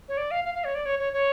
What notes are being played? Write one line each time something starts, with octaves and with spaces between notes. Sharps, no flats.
C#5
D5
F5
F5
F5
C#5
D5
C#5
C#5
C#5